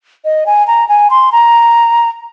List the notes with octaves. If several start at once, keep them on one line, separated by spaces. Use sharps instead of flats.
D#5
G#5
A#5
G#5
C6
A#5